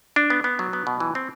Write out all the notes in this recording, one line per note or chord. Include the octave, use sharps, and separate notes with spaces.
D4
B3
B3
F#3
B3
B2
E3
C4